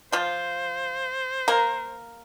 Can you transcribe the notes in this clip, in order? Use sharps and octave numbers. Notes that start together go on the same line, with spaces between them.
F3 F4 C5
A#3 A#4